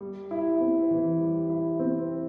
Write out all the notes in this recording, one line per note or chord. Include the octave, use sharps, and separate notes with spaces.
G3
E4
C4
E3
G3
E4
C4